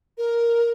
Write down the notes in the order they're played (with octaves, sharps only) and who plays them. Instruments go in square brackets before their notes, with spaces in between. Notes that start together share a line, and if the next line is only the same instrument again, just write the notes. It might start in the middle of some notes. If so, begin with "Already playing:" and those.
[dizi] A#4